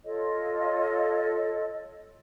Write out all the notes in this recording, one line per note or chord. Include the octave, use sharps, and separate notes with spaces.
F4 A4 C#5 D#5